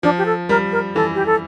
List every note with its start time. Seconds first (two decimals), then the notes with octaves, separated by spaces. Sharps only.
0.03 F3 D4
0.18 G4
0.26 A4
0.49 G3 A#4
0.72 A#4
0.95 E3 A4
1.15 G4
1.26 A4